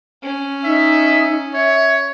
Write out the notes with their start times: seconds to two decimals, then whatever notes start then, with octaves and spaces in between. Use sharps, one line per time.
0.23 C#4
0.65 D#4 E5
1.54 C#5 E5